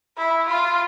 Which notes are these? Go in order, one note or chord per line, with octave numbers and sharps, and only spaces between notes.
E4
F4